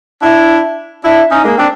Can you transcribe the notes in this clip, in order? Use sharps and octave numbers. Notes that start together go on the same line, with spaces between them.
D4 E4
D4 E4
C#4 D#4
G#3 A#3
C4 D4